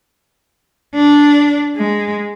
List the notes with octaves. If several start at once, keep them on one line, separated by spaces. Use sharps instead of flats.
D4
G#3